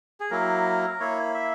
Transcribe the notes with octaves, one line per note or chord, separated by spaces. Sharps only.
G#4
F#3 A#3 E4 A#4
A#3 E4 C#5
E5